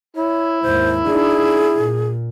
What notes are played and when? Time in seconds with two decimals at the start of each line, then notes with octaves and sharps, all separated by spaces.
0.16 E4 C#5
0.62 D#2 G#2 C5
1.06 D4 D#4 G#4
1.75 A#2